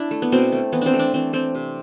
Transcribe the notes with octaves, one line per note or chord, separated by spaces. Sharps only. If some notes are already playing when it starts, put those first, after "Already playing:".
Already playing: D4 E4
A3
B3
B2 C4
A3
E3 B3
C4 D4
A3
D4
E3 C4
A3 C4
C3